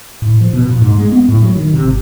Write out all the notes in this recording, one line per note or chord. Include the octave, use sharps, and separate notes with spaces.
A2
F3
B2
A#2
G#2
G#3
B3
A2
F#3
D#3
C3
G#1